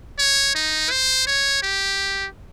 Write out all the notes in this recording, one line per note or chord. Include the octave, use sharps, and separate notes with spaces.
C#5
D#4
C5
C#5
G4